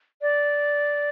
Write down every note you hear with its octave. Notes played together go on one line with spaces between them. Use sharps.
D5